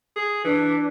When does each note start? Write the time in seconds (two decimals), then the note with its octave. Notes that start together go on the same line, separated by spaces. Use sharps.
0.16 G#4
0.45 E3 D4